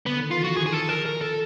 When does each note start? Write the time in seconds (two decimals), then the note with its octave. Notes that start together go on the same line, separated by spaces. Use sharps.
0.06 D3 B3
0.19 D#3
0.31 E3 F4
0.44 F3 F#4
0.55 D#3 G#4
0.66 G#4
0.73 A4
0.89 A#4
1.06 A#4
1.21 A4